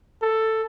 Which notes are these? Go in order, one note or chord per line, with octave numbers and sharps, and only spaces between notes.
A4